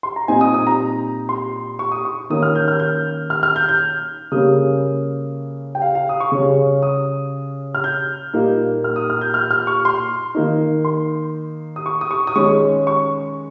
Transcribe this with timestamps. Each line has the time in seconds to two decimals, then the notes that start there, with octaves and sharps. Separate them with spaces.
0.03 C6
0.16 A#5
0.28 A#2 G3 C4 D#4 G#5
0.41 D#6
0.54 D#6
0.67 A#5
1.29 C6
1.79 C#6
1.92 D#6
2.05 C#6
2.30 D#3 A#3 C#4 D#6
2.43 F6
2.55 G6
2.68 F6
2.80 G6
3.30 F6
3.43 F6
3.56 G6
3.69 G6
4.32 C#3 G3 A#3 C#4 D#6
5.75 G5
5.82 F5
5.95 F5
6.09 D#6
6.20 C#6
6.32 C#3 G3 C#4
6.82 D#6
7.75 F6
7.84 G6
8.33 A#2 G3 A#3 D#4
8.84 F6
8.96 D#6
9.10 F6
9.21 G6
9.34 F6
9.51 F6
9.67 C#6
9.85 C6
10.35 D#3 A#3 D#4
10.85 C6
11.76 D#6
11.86 C#6
12.01 D#6
12.11 C#6
12.27 D#6
12.36 D#3 G#3 C#4 C#6
12.87 C#6